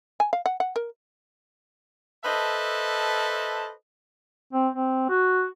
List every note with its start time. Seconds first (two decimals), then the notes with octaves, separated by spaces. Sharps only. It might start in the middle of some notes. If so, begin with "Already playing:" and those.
0.20 G#5
0.33 F5
0.46 F#5
0.60 F#5
0.76 A#4
2.25 A4 B4 C5 D#5 E5 A5
4.53 C4
4.74 C4
5.09 F#4